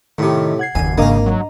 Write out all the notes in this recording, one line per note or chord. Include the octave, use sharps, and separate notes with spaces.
A2 C3 D#3
F#5 G#6 C7
F#1 D#2 D#3 G#5
G#1 C#3 A#3 D4 A#4 D#5 A#5
F#3